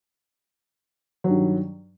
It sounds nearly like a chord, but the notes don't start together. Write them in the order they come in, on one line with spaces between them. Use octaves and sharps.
F#3 G2 D#3